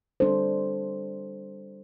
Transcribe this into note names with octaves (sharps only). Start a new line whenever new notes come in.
G3 D4 A4 C5